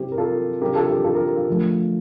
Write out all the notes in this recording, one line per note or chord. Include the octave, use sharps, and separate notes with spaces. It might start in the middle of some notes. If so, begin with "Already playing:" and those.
Already playing: C3 G3 C4 E4 G4
A#4
F4 A4
C3 G3 D4 G4 A#4
F4 A4
G4
F4 A4
G4 A#4
F4
D3 F3 A3